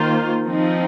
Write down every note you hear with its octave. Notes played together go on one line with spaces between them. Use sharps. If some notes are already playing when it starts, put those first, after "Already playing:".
Already playing: D#3 A#3 F4 C5
F3 C4 D#4